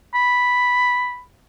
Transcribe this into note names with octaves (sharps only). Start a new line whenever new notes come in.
B5